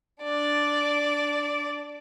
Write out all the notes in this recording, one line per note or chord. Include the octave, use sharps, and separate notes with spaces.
D4 D5